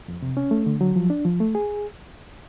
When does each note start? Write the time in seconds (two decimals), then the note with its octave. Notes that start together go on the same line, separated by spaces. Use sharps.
0.08 F2
0.22 C3
0.37 C#4
0.51 A3
0.66 D3
0.81 F#3
0.96 F3
1.10 D4
1.25 F3
1.40 A3
1.55 G#4